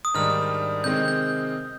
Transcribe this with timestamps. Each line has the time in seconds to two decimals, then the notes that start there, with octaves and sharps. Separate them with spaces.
0.05 D#6
0.14 G#2 D#3 G3 D4 F6
0.84 C3 D#3 G#3 C4 G6
0.96 G6
1.08 G6